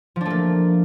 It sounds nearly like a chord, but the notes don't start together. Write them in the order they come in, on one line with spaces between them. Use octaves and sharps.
F3 D4 A3 A#3